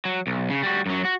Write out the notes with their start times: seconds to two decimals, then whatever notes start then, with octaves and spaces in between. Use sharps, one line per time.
0.05 F#3
0.27 B1
0.50 C#3
0.63 G3 F#4
0.86 F#2 F#3
1.05 F#4